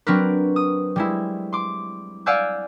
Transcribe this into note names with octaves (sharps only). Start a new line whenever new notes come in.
F#3 C4 D4 A#4 B4
D#6
G3 G#3 E4
C6 D6
D5 F5 F#5 G#5 E6 G6